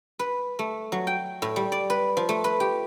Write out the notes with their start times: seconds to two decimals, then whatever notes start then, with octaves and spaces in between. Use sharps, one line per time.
0.19 B4
0.59 A3
0.92 F#3
1.07 G5
1.42 A2
1.56 G3
1.72 D5
1.90 B4
2.17 F3
2.29 A3
2.44 B4
2.60 G4